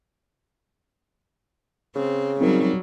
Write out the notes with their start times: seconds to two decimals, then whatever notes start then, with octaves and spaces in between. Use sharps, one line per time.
1.96 C#3 C4
2.41 F#3 G3 C4 D#4 A#4